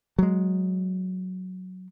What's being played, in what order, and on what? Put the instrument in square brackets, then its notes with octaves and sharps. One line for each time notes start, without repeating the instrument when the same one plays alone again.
[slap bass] F#3 G#3